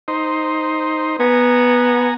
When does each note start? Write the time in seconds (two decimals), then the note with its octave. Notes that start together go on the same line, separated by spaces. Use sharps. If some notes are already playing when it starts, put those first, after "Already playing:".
0.08 D#4 C5
1.20 B3 G#5 A#5